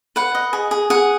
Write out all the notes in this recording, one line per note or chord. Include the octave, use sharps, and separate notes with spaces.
B4 F#5
D#5
G#4
G#4
G#4 F#5